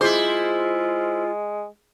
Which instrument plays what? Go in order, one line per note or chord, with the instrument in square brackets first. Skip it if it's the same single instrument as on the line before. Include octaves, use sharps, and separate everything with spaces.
[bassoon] G#3 [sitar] E4 C5 [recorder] F4 [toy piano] G#4 D6